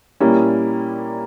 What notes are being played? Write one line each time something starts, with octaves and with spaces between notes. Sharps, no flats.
A#2 G3 A#3 C#4 E4